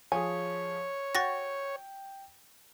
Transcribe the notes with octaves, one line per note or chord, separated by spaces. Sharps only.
F3 G#4 C#5 G#5
F#4 G5 C#6 A6 A#6